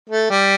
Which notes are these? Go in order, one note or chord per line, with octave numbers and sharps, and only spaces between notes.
A3
G3